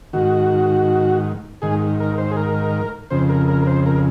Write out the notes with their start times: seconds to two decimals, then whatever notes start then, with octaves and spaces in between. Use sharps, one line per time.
0.13 G#2 D#3 F#4
1.62 G#2 D#3 G#4
2.00 A#4
2.18 C5
2.31 G#4
2.37 A#4
3.10 F2 C#3 C5
3.29 A#4
3.48 A#4
3.62 A#4
3.67 C5
3.86 A#4